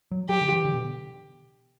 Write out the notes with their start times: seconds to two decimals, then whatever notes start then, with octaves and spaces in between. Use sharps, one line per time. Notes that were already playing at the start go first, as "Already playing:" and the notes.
0.11 F#3
0.29 F#3 G4
0.41 D3
0.52 E3
0.65 D3
0.74 B2